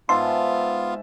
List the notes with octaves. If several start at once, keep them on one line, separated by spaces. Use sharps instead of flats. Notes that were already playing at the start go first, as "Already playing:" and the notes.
G#2 B3 F4 E5 F5 A5 C6